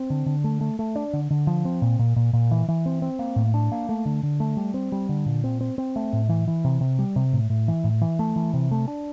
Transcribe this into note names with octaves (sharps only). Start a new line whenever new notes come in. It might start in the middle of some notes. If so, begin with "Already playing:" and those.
Already playing: C4
D3
D3
A3
A3
A3
D4
D3
D3
F3
C4
A#2
A#2
A#2
A#2
E3
E3
C4
C4
A#3
A2
D4
A#3
A3
D3
D3
A3
G3
C4
G3
D3
A#2
C4
C4
C4
A3
A2
E3
E3
C3
C3
G3
C3
A2
A2
E3
A2
E3
A3
E3
C3
A3
D4